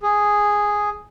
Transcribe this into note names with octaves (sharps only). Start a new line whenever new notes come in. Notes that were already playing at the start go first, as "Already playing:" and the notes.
G#4